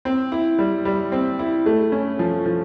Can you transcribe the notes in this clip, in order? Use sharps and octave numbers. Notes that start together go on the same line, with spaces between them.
C4
E4
G3
G3
C4
E4
A3
C#4
F3
F3